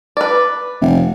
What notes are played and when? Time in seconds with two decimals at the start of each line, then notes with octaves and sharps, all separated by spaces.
0.17 B4 D5
0.81 F1